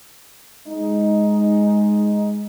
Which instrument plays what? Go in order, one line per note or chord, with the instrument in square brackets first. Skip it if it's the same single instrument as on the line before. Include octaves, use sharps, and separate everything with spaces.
[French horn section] G#3 D#4